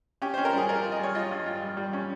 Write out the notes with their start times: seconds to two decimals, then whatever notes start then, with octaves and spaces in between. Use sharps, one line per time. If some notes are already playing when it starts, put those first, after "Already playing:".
0.22 C#4 G4
0.34 C#4 C5
0.45 A#4
0.53 G3 G#4
0.69 F4 A#4
0.84 F4
0.92 D#5
0.99 G3 C#5
1.15 F4 D#5
1.31 G2
1.46 F4
1.62 G3
1.77 G3
1.93 C#4